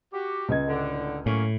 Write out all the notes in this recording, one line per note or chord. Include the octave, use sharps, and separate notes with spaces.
F#4 G4
C#2 D#5 G#6
A2 D3
A2 F#3 A#3 C#4